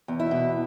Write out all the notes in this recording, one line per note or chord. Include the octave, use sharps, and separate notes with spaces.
E2
E4
B2